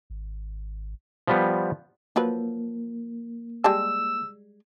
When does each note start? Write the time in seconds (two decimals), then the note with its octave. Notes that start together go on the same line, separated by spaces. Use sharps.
0.10 G#1
1.27 F3 G3 B3
2.16 F3 F#3 A#3 B4
3.64 G3 G#3 A5 E6